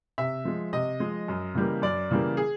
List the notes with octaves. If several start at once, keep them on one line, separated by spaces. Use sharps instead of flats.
C3 E5
F3 G#3
C3 D#5
F3 G#3
F#2
C#3 E3 G3 A#3
F#2 D5
C#3 E3 G3 A#3
G#4